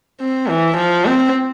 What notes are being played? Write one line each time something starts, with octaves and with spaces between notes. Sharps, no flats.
C4
E3
F3
C4